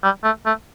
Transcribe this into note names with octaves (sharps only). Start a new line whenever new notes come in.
G3
A3
A3